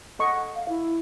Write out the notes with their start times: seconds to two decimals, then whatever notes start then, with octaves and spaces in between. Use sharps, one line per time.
0.19 A4 D#5 F#5 C#6
0.55 F5
0.69 E4